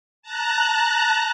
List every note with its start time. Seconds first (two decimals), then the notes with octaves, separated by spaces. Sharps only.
0.22 A5 A#5 F#6